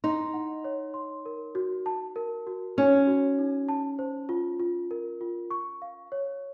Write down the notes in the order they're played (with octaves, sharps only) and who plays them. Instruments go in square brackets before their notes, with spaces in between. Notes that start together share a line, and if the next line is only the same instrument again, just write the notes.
[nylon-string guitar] D#4 [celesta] C6
[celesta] F#5
C#5
C6
A#4
F#4
A5
A#4
F#4
[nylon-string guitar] C#4 [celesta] D#4
[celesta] F#4
D#4
A5
C5
F4
F4
A#4
F4
C#6
F5
C#5